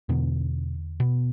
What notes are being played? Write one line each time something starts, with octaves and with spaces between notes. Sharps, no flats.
E2 B2 D3 B3
B2 B3